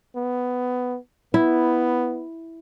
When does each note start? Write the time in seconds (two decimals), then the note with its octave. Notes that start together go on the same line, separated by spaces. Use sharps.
0.16 B3
1.34 B3 E4